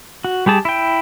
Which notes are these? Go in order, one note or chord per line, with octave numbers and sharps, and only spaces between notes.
F#4
G3 G4 G#4 A5
E4 G5